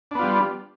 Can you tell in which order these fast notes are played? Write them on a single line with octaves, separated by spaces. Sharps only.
D4 B3 F4 G3